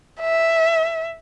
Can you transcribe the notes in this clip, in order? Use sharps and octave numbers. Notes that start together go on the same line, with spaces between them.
E5